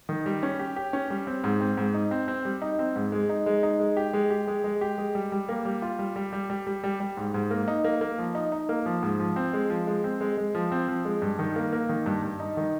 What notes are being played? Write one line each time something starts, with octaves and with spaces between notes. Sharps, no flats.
D#3
G3
C#4
G4
G4
C#4
G3
C4
G#2
C4
G#2
D#4
C4
C4
G3
D#4
C4
G#2
G#3
D#4
G#3
D#4
G#3
G4
G#3
G4
G#3
G#3
G4
G#3
G3
G3
A#3
G3
F4
G3
G3
G3
G3
G3
G3
G3
G#2
G#2
A#3
D#4
A#3
A#3
F3
D#4
D#4
A#3
F3
G#2
F3
C4
G#3
F3
G#3
C4
G#3
G#3
F3
C4
F3
G#3
G2
D#3
A#3
A#3
D#3
G2
G2
D#4
D#3